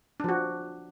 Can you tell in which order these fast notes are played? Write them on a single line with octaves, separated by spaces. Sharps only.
D4 F3 F#4